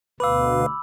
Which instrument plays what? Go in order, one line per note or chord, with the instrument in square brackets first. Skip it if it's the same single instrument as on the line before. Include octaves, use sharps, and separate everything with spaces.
[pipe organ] D2 B2 [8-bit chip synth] B4 F5 [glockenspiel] B5 D6 E6